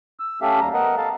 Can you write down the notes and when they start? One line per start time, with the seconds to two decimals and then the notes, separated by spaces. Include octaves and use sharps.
0.20 E6
0.42 A3 C#4 G4 A4 E5 F5
0.61 D#2 G3 A#5
0.74 B3 A#4 D#5 F#5
0.97 A4 F5 A5